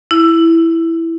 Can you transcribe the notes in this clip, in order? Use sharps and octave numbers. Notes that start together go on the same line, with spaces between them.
E4